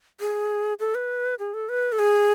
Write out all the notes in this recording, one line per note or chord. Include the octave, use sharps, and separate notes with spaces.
G#4
A4
B4
G#4
A4
B4
A4
G#4